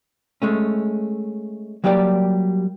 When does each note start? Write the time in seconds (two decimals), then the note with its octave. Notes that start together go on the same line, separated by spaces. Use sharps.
0.42 G#3 A3 C#4
1.84 F#3 G3 A#3 G4 A4 D5